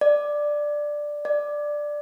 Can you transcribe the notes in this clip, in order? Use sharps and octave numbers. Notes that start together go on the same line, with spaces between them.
D5
D5